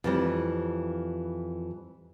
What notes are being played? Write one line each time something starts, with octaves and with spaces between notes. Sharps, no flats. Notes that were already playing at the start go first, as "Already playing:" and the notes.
F2 E3 G3